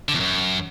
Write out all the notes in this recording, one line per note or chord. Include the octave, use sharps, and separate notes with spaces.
D3
E2
F#2